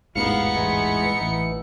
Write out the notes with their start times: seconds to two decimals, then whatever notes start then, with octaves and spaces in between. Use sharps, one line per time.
0.15 E1 A1 G#2 B3 D#4 F5 C#7
0.56 E3 G#3
1.21 A1 E3